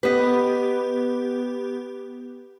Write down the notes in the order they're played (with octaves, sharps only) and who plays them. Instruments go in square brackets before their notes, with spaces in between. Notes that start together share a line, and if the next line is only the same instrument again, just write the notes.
[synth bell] B3 G4 [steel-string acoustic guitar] B4 D#5